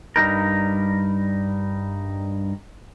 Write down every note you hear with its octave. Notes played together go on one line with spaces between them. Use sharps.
G2 G3 D#4 A#4